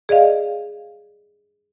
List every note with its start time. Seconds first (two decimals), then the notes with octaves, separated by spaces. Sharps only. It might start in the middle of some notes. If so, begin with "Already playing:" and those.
0.09 G#4 D5 D#5 F5